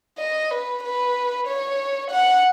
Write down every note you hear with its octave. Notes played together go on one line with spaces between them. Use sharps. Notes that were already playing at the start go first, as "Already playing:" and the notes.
D#5
B4
B4
C#5
F#5